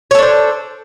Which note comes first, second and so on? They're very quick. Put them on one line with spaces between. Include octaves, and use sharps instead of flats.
C#5 A4 D4 C5